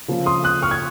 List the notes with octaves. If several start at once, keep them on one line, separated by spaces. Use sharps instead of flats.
C#3 F3 A#3
C6 D#6
D#6 F#6
C#6 F6
G#6